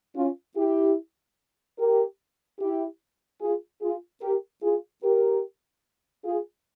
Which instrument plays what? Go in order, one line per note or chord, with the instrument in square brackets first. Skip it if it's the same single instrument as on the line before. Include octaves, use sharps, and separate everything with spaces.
[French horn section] C#4 F4
E4 G4
G4 A#4
E4 G4
F4 G#4
F4 G#4
G4 A#4
F4 G#4
G4 A#4
F4 G#4